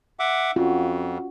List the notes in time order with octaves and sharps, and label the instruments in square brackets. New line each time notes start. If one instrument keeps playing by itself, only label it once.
[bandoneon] E5 F#5 D6
[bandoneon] F2 [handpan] C#4 F4 F#4